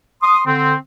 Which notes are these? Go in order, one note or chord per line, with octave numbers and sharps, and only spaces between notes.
C6 D#6
D3 C4